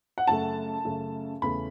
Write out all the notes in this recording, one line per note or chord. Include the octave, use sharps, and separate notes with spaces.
F#5
F#2 C#3 A3 A5
F#2 C#3 A3
E2 C#3 A3 C#4 B5